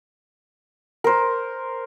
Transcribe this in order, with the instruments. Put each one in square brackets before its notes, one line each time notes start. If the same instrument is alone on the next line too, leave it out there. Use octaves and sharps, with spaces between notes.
[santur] A#4 C5